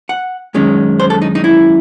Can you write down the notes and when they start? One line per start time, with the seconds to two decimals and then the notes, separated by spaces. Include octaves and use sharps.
0.09 F#5
0.54 F#2 D#3 G#3 C#4
1.00 C5
1.10 A4
1.22 D#4
1.35 D#4
1.44 E4